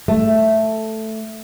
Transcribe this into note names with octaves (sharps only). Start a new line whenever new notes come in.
A3